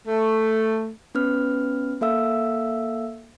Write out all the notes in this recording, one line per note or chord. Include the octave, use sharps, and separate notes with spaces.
A3
B3 C#4 B4 F6
A#3 A4 E5 F5 E6